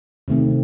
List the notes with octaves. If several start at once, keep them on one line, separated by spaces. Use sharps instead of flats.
C3 D#3 A3 C4